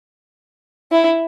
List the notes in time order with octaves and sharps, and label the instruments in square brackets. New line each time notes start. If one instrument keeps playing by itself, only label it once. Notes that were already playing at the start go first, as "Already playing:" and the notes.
[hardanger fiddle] E4